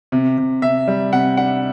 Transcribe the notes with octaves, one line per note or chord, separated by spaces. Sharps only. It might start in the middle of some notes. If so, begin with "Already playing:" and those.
C3
C3
C3 E5
G3
C3 F#5
D4 F#5